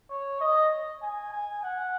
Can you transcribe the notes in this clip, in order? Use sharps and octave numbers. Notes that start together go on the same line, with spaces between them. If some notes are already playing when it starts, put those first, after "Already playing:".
C#5
D#5
G#5
G#5
F#5